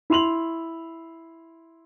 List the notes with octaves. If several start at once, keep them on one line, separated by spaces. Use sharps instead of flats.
E4 C6 F7 F#7